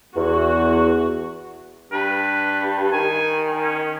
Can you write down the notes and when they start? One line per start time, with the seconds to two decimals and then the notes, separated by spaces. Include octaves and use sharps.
0.16 E2 F#4
1.92 G2 B4
2.92 D#3 G#5
3.63 C#4